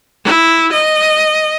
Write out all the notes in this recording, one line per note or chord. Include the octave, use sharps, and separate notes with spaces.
E4
D#5